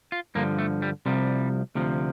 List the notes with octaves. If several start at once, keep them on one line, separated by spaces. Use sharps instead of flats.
F4
G2 D3 F3 A#3
A3
G3
C2 C3 F3 G3
D2 C3 F3